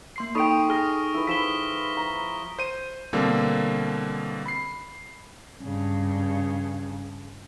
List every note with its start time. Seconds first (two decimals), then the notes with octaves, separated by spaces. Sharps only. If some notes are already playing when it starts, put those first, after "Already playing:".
0.16 A#3 C6 C7
0.35 D#4 A4 D#5 G5 B5 C#6 D#6 D7
0.69 G#4 D#6 F6 A#6
1.14 E4 B4
1.27 F3 E4 B6 E7 G7
1.97 A#5
2.59 C5 D#7
3.13 B2 D3 G3 A#3 C4
4.46 B5 C7
5.63 G2 C#3